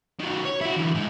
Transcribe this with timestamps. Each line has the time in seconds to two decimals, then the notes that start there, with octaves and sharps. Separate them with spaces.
0.20 D#3 F#3
0.45 C#5
0.61 E4 F#4
0.76 D3 E3
0.95 A2 G#3